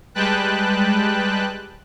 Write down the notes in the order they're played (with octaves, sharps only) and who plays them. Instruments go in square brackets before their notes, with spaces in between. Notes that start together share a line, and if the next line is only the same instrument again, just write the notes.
[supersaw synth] G3 G#3 B4 G5 A5 F#6